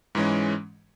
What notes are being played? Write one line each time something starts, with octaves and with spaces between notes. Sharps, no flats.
G#2 E3 G#3 C#4